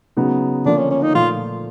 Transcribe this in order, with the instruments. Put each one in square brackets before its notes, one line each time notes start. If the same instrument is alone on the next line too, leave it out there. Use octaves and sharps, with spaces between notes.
[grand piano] C#3 F#3 B3 D#4
[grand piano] D3 F3 A#3 [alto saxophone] D4
[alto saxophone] C#4
C#4
D#4
[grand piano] A#2 F3 A3 [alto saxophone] F4